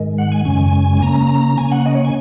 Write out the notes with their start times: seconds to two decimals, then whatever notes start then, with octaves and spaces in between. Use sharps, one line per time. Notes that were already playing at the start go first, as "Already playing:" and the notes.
Already playing: G#2 D#3 G#3
0.18 F#5
0.32 G#5
0.45 F#2 C#3 G#3 C#4 G#5
1.02 C#3 A#3 C#4 A#5
1.58 C#3 A#3 C#4 G#5
1.72 F#5
1.86 D#5
1.95 C#5
2.05 G#5